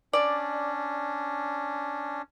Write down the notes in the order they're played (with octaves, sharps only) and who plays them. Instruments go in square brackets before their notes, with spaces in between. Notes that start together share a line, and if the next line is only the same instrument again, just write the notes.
[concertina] C#4 D4 [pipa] D5